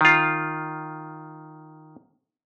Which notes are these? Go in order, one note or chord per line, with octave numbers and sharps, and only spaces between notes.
D#3 F4